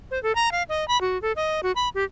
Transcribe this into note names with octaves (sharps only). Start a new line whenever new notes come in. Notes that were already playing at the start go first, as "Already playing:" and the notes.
C5
A4
A#5
F5
D#5
B5
F#4
A4
D#5
F#4
B5
G4